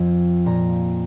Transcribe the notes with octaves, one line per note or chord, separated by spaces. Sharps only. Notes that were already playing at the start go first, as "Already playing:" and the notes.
Already playing: F2 F3
A#2 A#5